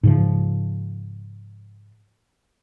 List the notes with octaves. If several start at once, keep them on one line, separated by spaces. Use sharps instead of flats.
G#2 C#3 F3